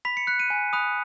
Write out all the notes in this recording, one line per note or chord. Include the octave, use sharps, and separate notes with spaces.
B5 B6
C#7
F#6 C#7
D#7
G#5
B5 D#6 F#6